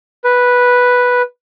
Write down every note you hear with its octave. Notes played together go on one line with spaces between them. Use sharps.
B4